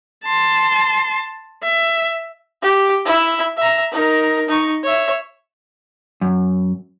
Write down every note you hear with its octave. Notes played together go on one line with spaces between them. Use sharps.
A5 C6
E5
G4
E4 E5
E5 A#5
D#4 A#4
D#4 C#6
C#5 E5
F#2